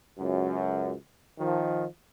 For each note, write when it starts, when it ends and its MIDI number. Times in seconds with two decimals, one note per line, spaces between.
0.18 0.93 37
0.18 0.93 42
1.38 1.85 51
1.38 1.85 53